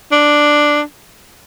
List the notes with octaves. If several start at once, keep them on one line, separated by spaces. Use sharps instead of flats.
D4